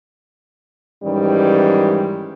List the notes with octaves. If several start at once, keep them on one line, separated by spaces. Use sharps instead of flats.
G#2 D#3 E3 G3 C#4